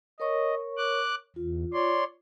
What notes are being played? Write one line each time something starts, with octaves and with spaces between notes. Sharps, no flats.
A#4 C#5 D#5 C#6
D6 F#6
E2 F4
C#5 D5 C6